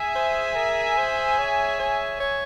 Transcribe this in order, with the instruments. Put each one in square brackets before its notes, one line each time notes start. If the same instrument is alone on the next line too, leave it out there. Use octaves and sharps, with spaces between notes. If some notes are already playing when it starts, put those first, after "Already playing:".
Already playing: [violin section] G#4 E5 G#5
[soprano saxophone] C5
A#4
C5
C#5
C#5
C#5